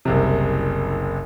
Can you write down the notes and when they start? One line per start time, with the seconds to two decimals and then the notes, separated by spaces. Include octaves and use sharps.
0.05 F#1 C2 C3